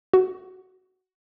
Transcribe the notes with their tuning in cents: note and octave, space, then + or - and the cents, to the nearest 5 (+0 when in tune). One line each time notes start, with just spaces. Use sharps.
F#4 +15